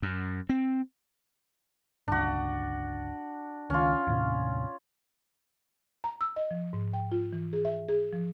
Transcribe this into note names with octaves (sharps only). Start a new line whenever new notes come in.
F#2
C4
G1 C#2 D4 F#4
C#2 D#3 C#4 F4
D#2 A2 C3
A#5
E6
D#5
F3
G#2
G5
F4
E3
G#4
E5
G#4
F3